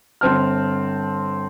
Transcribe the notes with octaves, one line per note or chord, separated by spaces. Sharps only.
G1 C4 A5 F6